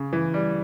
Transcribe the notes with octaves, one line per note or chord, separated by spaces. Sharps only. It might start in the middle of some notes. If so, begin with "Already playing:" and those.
Already playing: C#3
E3
G3